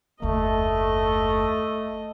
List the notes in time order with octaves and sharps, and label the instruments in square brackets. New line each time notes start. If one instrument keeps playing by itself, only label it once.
[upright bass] F#1 D#2 [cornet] A3 [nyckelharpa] D#5